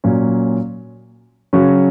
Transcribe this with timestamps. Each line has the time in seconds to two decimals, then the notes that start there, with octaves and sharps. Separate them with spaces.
0.04 A#2 F#3 C#4
1.53 C#3 F#3 C#4 F#4